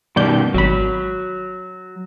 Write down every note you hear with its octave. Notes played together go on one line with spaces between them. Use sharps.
G2 B2 D#3 D5 G6
G#1 F#3 B5